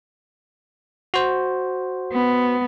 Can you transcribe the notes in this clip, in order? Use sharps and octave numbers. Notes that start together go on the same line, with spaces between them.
F#4 C5
B3